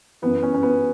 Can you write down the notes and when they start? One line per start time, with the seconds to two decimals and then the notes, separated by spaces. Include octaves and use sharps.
0.22 F#2 E3 B3
0.43 C#4
0.54 C#4
0.63 B3